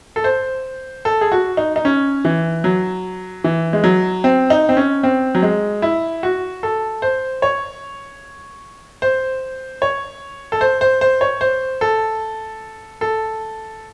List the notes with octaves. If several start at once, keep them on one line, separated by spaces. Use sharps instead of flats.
A4
C5
A4
G#4
F#4
D#4
D#4
C#4
E3
F#3
E3
G#3
F#3
C4
D#4
C4
C#4
C4
F#3
G#3
E4
F#4
A4
C5
C#5
C5
C#5
A4
C5
C5
C5
C#5
C5
A4
A4